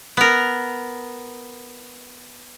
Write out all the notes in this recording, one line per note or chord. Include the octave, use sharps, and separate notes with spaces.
B3 A#4